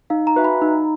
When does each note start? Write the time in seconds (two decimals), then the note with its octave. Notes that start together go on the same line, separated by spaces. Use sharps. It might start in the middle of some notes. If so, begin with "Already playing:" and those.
0.10 D#4 F5
0.27 A#5
0.36 F#4 B4 E5 G#5
0.45 B5
0.62 D#4